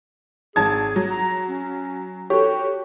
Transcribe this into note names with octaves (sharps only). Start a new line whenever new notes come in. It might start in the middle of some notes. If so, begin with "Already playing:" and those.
G#1 G#4 A5 G#6
F#3
A#5
C#4
F#4 G4 A4 C#5